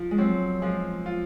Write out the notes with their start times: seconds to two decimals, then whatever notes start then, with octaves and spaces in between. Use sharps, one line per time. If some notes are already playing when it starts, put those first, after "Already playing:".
Already playing: F3
0.11 G#3
0.18 F#3 C4
0.62 F3 G#3
1.06 F4